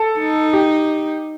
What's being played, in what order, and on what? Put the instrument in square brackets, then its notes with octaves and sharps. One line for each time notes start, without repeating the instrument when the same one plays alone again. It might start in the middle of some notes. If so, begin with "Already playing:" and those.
Already playing: [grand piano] A4
[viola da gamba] D#4
[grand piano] G4